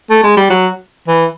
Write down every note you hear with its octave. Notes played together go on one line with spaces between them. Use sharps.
A3
G#3
G3
F#3
E3